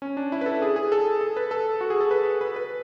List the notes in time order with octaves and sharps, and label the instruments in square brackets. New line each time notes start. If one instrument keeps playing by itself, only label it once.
[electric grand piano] C#4
D4
E4
B4
A4
G#4
G#4
A4
A4
B4
A4
F#4
G#4
A4
B4
B4
B4